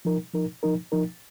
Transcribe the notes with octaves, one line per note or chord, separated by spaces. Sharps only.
F3 D#4 A#4
F3 D#4 A#4
F3 D#4 A#4
F3 D#4 A#4